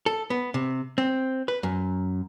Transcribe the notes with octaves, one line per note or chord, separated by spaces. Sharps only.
A4
B3
C3
C4
B4
F#2